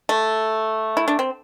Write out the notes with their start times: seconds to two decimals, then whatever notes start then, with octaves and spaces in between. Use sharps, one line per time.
0.09 A3
0.97 E4
1.08 D4
1.19 C4